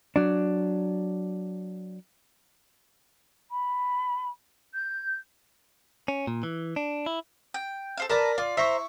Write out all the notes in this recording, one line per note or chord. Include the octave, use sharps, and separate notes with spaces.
F#3 D4
B5
G6
C#4
A#2
E3
D4
E4
G5
A4 C5 F5
A#4 B4 D5 A5 A#5
F4 D5
E4 C5 E5 A#5 C#6